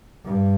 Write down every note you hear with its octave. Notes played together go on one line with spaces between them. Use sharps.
G2